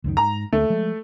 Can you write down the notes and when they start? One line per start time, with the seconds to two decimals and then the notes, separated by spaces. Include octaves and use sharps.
0.04 C#2 F#2 D#3
0.17 G#2 A#5
0.53 D2 A3
0.70 F3 G#3